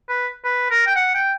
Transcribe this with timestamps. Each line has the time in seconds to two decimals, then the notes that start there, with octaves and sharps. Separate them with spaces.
0.09 B4
0.45 B4
0.70 A#4
0.87 G5
0.96 F#5
1.14 G5